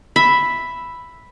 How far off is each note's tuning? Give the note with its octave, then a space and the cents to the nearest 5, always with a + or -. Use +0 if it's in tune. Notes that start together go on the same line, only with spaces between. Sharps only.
E5 +0 B5 +0